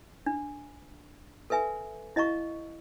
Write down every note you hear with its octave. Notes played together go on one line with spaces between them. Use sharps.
D4
A4 B4 E5 G#5
E4 D#5 F5 A#5 C#6